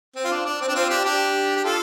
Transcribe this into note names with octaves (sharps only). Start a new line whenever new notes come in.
C4
F4
D4
D4
C4
D4
C4 F4
D4 G4
D4 G4
G4
F4 A4